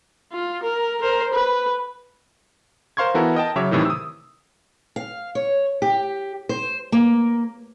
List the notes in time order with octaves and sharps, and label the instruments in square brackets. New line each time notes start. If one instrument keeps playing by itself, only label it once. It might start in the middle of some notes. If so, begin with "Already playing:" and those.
[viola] F4
A#4
A#4 C5
B4
[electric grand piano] A#4 C5 F5 C6 C#6 G#6
E3 B3 E4 F#4 A4 A#4
A#4 D#5 G5 A5
C#3 F#3 C#5 E5 D6
A2 C3 D#3 E3
D#6 E6
[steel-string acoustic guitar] F5
C#5
G4
C5
A#3